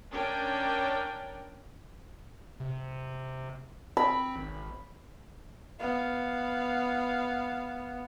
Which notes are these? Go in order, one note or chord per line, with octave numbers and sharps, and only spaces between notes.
C#4 D4 A#4 G5
C3
C4 B5
G#1
B3 F5